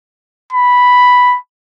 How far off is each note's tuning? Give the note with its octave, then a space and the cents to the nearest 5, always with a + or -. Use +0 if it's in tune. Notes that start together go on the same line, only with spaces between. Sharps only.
B5 +0